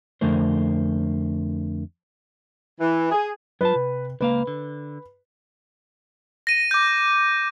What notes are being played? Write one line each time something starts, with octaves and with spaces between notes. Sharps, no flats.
F2 D3 A3 A#4 C5
E3
G#4
F#3 F4 B4 A5
C3
C#2 A#3 B4 F5
D3
A#6 D#7
D6 G6